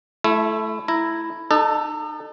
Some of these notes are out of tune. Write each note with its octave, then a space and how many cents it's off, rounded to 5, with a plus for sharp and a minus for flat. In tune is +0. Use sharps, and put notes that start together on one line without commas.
A3 -15 E4 +20
E4 +5 A#5 +0
D#4 -35 A4 +5